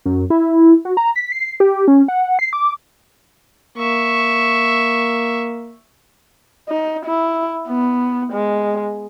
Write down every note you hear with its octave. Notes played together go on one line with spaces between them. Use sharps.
F#2
E4
F#4
A#5
B6
C7
G4
C#4
F#5
C7
D6
A#3 E5 C#6
D#4
E4
B3
G#3